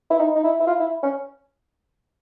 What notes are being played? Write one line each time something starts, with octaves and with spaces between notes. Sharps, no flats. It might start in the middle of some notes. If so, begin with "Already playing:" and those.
E4
D#4
D#4
E4
E4
F4
E4
C#4